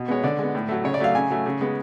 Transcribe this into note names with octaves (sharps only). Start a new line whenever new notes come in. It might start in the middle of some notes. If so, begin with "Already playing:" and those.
Already playing: B2
G#3 B3 C#5
D3 D5
G#3 B3
A2
F#3 A3
C#3 C#5
D5
F#3 A3 F5
C#3 G#5
F#3 A3
C#3
G#3 B3